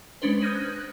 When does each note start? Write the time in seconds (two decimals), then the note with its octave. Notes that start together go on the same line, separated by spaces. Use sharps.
0.22 G#3 C#4 D4 B4 C5
0.42 D#6 F6 G6 G#6 A#6 D#7
0.55 F#6